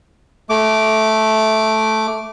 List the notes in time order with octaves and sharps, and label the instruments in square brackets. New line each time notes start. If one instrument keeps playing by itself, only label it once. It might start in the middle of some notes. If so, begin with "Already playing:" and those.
[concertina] A3 D6